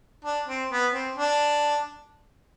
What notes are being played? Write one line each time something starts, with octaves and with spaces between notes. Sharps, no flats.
D4
C4
B3
C4
D4